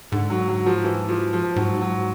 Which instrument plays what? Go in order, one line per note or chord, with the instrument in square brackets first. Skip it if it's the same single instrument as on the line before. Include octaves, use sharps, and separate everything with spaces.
[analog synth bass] G#2 [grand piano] D3
[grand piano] F#3
F#3
F3
E3
F3
F3
[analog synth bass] G#2 [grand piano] F#3
[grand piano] F#3